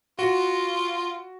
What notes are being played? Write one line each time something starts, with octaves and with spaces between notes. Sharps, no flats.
F4 F#4